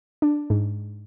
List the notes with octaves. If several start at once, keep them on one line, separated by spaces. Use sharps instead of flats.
D4
G#2